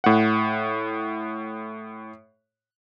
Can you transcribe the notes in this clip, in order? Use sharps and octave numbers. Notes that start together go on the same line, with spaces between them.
A2 F#5